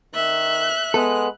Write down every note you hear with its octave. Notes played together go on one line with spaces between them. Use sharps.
D#3 E5 F#6
G#3 B3 A4